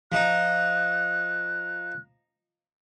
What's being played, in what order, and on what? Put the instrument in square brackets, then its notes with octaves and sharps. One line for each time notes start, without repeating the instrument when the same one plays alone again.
[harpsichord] F3 D#4 [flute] F#6